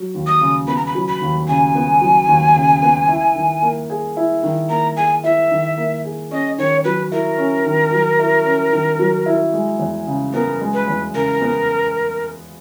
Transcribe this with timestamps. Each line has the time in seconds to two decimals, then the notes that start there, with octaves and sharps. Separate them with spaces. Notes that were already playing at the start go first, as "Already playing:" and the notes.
Already playing: F#3
0.14 D#2
0.27 D#6
0.41 C#3
0.68 B3 B5
0.76 A#5
0.86 B5
0.95 F#3
1.07 B5
1.21 D#2
1.48 C#3 G#5
1.75 B3
2.01 F#3
2.28 D#2
2.56 C#3
2.82 B3
3.09 E4
3.36 D#3
3.62 A#3
3.90 G#4
4.17 E4
4.43 D#3
4.70 A#3 A#5
4.96 G#4 G#5
5.24 E4 E5
5.51 D#3
5.77 A#3
6.04 G#4
6.31 C#4 D#5
6.58 D#3 C#5
6.84 F#3 B4
7.12 E4 A#4
7.38 C#4
7.66 D#3
7.92 F#3
8.19 E4
8.45 C#4
8.73 D#3
8.99 F#3
9.26 E4
9.54 G#3
9.79 E2
10.07 C#3
10.33 B3 A#4
10.61 G#3
10.74 B4
10.87 E2
11.14 C#3 A#4
11.41 B3